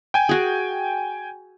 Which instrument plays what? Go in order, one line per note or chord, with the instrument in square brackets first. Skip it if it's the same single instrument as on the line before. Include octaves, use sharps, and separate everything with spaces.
[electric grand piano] G5 G#5
[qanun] F#4 G#4